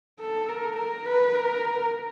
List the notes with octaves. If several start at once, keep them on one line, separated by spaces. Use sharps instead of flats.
A4
A#4
A#4
B4
A#4